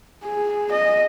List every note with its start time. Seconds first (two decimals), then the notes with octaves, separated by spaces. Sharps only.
0.24 G#4
0.72 D#5